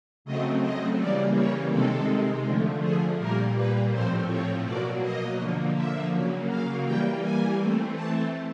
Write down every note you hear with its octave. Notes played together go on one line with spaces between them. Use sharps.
C#3 F#3 A3 C4 D#5
D#5
C#3 E3 G3 A#3 D5
C#5
C3 D#3 G#3 C4 A4
D3 F3 A3
G#4
A#2 G3 A#3 A#4
B4
A2 F3 A3 C4 C5
C#5
B2 F#3 A#3 D5
D#5
D3 F3 A#3
E5
C#3 F#3 A#3
F5
E3 G3 A#3 G5
G#5
E3 A3 C4
A5